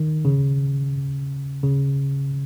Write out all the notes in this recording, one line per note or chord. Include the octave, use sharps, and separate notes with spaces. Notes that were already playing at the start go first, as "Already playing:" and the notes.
Already playing: D#3
C#3
C#3